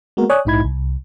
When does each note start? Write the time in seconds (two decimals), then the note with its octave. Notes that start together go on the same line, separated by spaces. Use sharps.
0.17 G#3 A#3 B3 F#4 A#4
0.30 C#5 D5 G#5 D#6 F#6
0.45 A#1 G#2 D#4 E4 B5 G#6
0.65 C2